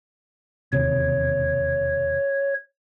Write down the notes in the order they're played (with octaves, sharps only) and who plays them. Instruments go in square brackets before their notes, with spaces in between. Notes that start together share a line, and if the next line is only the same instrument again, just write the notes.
[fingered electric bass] E1 D#2 C3 [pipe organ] C#5